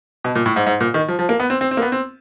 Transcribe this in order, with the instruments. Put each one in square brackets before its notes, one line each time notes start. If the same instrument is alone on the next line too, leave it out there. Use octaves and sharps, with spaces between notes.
[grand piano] B2
A#2
A2
G#2
G#2
A#2
D#3
F3
F3
A#3
B3
C4
C4
C4
A#3
B3
C4